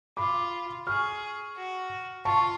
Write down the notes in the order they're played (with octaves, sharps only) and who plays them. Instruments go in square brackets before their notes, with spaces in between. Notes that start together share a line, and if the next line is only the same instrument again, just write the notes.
[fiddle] F4 [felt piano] B5 D6
[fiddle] G#4 [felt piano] C#6 F6
[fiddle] F#4
[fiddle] F4 [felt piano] A5 C#6